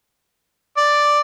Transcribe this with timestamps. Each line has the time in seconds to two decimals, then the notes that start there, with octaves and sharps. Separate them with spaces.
0.78 D5